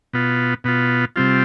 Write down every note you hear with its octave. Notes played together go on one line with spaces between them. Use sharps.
B2 B3 F4
B2 B3 F4
C3 G3 C4 F4